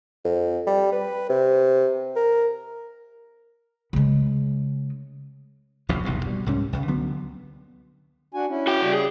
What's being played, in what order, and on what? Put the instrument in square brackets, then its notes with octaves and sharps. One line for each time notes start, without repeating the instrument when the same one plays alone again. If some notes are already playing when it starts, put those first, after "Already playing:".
[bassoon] F2
G3
B4
C3
A#4
[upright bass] C#3 G#3
[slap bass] D1 A#1 F2 C3
F1 B1 E2 G2
B2 G3
C2 G#2 C3 C#4
C#2 C#3
D3 F#3 B3
[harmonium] D4 F#4 G#5
C#4 E4
[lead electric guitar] F#4 G5
[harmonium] C#3 G3
[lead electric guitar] G#4